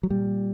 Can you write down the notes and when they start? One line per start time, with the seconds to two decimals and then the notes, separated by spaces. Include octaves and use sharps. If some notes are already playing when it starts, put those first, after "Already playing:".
0.03 F#3
0.10 A#2 G3